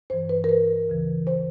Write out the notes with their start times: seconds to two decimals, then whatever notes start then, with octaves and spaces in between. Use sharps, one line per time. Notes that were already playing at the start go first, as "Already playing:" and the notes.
0.10 G2 E3 C5
0.29 B4
0.44 A#4
0.49 B4
0.89 D2 C#3 E3
1.27 C5